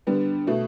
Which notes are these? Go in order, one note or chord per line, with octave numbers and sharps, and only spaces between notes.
D3 G3 B3
B2 A3